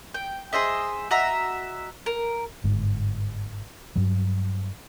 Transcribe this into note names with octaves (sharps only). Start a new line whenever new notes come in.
G5
G#4 C5 D#5 E5
F#4 D#5 E5 A#5
A#4
G1 G#2
G2 F#3